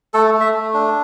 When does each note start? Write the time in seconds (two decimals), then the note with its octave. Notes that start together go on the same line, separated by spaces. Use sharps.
0.14 A3 A4
0.34 A3
0.41 E5
0.54 A3
0.74 D4